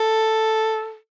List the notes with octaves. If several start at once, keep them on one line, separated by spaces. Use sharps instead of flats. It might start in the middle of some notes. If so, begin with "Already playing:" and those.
Already playing: A4